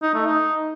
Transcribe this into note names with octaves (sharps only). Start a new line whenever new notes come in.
D#4
A3
D#4